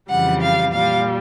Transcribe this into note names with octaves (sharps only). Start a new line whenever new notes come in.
F2 C#3 E3 G3 F#5
F5
A#2 G3 F5